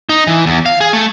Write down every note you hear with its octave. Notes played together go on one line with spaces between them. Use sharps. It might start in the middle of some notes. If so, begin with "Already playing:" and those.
D#4
E3
E2
F5
G#4
A3